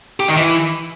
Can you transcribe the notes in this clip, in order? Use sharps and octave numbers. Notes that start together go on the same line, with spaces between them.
G4
D#3
E3